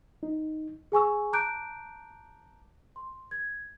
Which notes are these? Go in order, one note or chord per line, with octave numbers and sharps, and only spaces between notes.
D#4
G#4 G#5 C#6 E6
A5 A#5 D6 F#6 G6 D7
C6
G#6